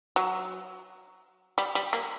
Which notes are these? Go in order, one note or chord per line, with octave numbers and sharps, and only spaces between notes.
F#3
G3
G3
A#3